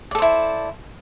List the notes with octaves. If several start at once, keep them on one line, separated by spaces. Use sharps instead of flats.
E4 A4 C5 D5